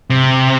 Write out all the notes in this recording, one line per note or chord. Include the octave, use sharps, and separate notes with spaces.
C3